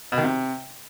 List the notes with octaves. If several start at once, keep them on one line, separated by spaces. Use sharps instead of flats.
B2
D#3
C3